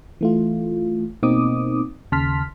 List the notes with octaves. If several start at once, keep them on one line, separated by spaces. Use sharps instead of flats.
E3 A3 F4
B2 A#3 C4 D#4 D6 D#6
D#2 C#3 A5 C6 F6 B6